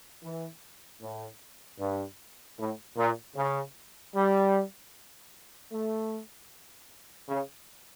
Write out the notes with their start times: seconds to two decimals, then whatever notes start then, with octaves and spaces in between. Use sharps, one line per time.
0.23 E3
1.01 A2
1.79 G2
2.58 A2
2.97 A#2
3.36 C#3
4.14 G3
5.71 A3
7.28 C#3